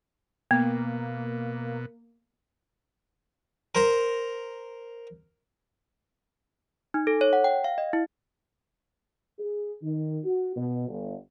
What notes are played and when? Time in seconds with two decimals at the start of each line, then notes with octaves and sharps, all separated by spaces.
0.51 B2 A#3 B3
3.75 A#4 C5 A#5
6.94 D#4
7.07 A4
7.21 C#5
7.33 F#5
7.44 G5
7.64 F5
7.78 D#5
7.93 E4
9.40 G#4
9.83 D#3
10.25 F#4
10.56 B2
10.89 G1